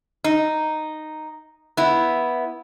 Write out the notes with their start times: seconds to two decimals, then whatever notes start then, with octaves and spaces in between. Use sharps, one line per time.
0.24 D#4
1.77 B3 E4